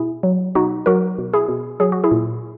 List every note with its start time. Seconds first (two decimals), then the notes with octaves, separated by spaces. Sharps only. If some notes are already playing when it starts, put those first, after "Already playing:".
Already playing: B2 E4 G#4
0.23 F#3
0.55 B2 D#4 F#4
0.86 F#3 F#4 A#4
1.18 B2
1.34 E4 G#4
1.48 B2
1.80 F#3 G#4
1.92 F#4
2.04 E4 G#4
2.11 A#2